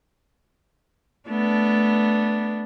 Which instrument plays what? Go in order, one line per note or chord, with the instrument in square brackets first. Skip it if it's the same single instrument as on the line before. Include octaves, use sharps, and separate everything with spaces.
[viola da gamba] A3 B3 D4